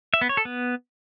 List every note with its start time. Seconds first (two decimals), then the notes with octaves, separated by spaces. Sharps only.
0.14 E5
0.21 B3
0.29 C#5
0.37 A4
0.45 B3